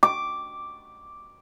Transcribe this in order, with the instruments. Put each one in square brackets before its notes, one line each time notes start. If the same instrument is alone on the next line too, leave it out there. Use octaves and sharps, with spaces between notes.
[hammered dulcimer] D6